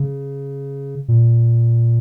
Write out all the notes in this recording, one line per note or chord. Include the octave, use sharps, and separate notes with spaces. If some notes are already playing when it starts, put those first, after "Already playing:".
Already playing: C#3
A#2